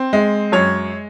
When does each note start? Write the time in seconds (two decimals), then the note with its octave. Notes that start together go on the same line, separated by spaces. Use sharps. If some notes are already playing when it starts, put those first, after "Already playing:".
Already playing: C4
0.13 G#3
0.52 F#2 C#5